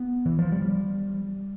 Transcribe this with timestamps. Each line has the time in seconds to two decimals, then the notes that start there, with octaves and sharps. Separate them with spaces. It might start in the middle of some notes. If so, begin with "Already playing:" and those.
Already playing: B3
0.26 E3
0.39 F3
0.52 G3